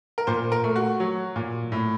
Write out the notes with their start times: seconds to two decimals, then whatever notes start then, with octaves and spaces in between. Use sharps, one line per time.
0.18 A#4
0.27 A#2 C5
0.52 A#4
0.64 A3
0.76 F#4
1.00 F#3
1.36 A#2
1.72 A2